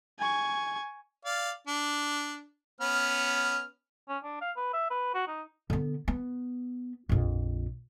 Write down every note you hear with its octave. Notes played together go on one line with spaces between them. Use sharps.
G#5 C#6
D5 F5
D4
B3 C#4 F6
C#4
D4
F5
B4
E5
B4
F#4
D#4
D3 B3
B3
A#1 F2